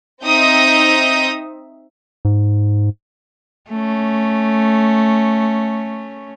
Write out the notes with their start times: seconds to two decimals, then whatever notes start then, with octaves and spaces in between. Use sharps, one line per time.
0.24 C4 D#4 E5 D#6 G6 A#6
2.25 G#2
3.69 A3 C#4